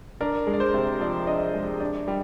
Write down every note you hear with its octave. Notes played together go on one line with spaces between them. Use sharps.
D4 A#4
G#3
D5
C5
C3
F3 D5
D4 D#5
G#3
D4
G3